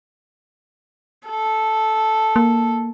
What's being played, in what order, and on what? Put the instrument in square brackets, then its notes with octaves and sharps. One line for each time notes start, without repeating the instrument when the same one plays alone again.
[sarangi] A4
[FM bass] A#3